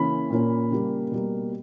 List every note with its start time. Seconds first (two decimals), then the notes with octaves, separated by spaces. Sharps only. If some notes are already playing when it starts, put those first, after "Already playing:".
Already playing: C#3 E3 A#3 C#4 B5
0.31 A#2 A#3 C#4
0.71 C#3 G3 A#3
1.12 B2 G3 A#3